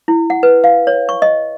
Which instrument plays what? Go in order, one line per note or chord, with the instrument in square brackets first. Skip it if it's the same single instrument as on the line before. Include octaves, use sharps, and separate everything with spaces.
[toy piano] E4
F#5
B4
F5
C#5
C#6
D#5